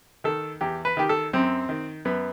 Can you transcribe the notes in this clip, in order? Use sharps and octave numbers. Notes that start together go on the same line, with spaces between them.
D#3 A4
E2 G4
B4
D#3 G4
A4
F#2 C4
D#3
F#2 B3